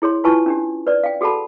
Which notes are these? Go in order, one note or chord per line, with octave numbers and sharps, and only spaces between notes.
E4 G#4 C#5 C6
E4 F4 B4 G#5 A5 C#6
C#4 D4 G4
B4 D5
F5 G5
F#4 G#4 A4 F#5 A5 B5